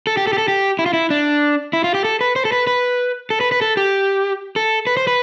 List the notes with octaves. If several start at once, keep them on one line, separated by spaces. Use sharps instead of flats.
A4
G4
A4
G4
A4
G4
E4
F4
E4
D4
E4
F4
G4
A4
B4
C5
A4
B4
B4
A4
B4
B4
A4
G4
A4
B4
C5
B4